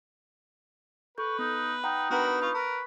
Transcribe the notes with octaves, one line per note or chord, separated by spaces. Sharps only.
A4 B4 C#6 G6
B3 D#4
D#4 F#5 G5 A#5
B3 D4 F#4 A#4 B4 B5
F4 B5 C#6
A#4 B4